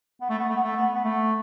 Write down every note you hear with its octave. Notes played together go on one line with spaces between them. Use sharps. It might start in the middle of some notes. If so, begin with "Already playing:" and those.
B3
A3
B3
A3
B3
A3
B3
B3
A3